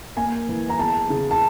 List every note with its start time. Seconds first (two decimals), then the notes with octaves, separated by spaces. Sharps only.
0.17 A#3 G#5
0.49 E3
0.69 A#5
0.79 E2 A5
1.10 C#3
1.31 A5